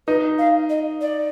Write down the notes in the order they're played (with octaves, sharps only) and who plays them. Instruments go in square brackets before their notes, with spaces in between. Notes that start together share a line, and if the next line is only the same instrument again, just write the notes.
[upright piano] D#4 [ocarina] B4
[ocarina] F5
D#5
D5